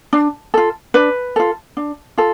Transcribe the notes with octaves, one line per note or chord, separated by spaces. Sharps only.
D4
F4 A4
D4 B4
F4 A4
D4
F4 A4